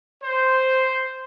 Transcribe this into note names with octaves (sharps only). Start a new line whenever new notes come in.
C5